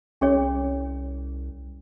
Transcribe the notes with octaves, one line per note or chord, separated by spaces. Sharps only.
C2 C#4 G#4 C#5